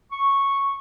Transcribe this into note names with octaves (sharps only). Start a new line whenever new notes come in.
C#6